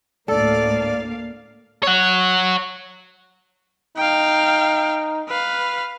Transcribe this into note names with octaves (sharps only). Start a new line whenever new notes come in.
D2 A2 A#3 A4 D5 F5
C#5 F#5
D#4 F5 G5
B4 F5